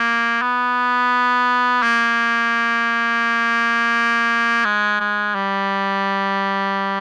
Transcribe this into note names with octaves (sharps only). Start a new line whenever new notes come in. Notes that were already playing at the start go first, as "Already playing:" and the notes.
Already playing: A#3
B3
A#3
G#3
G#3
G3